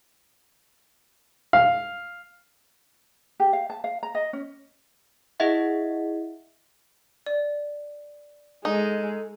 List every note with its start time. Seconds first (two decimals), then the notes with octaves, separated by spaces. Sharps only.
1.53 F5
3.40 G4
3.53 F5
3.70 A5
3.84 F5
4.03 A#5
4.15 D#5
4.33 C#4
5.40 E4 G#4 D#5 E5 F#5
7.26 D5
8.65 G#3 D#4 A4